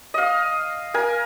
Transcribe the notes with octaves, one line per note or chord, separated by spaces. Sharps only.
D#5 F5
A#4 G#5